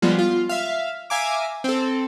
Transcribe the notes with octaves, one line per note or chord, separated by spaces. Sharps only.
F3 G3 G#3 B3
F4
E5 F5
E5 F5 G#5 A#5 D6
C4 A4